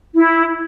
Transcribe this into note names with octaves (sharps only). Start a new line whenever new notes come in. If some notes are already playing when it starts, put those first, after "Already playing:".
E4